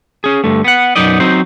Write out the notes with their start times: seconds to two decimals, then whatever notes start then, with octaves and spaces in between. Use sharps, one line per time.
0.24 C#4 G#4
0.44 G2 D3 A3
0.64 B3 F#5
0.96 B1 F#2 B3 D#4 D5 D#5
1.20 F#3 C4 D#4 C5